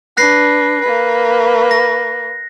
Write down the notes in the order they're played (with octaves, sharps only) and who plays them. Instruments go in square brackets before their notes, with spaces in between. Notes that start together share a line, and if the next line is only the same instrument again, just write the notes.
[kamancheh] D4 B4 [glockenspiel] F#6 A#6 C7
[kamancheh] A#3 B4
[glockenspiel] A#6